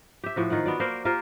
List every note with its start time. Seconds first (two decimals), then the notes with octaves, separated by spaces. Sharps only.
0.24 G4 E5
0.36 A2 F3 F#4
0.50 D#3 F4 F#5
0.66 B3 F#4 D5
0.80 A#3 A#4 C5 D5
1.05 F4 G4 A#4 C5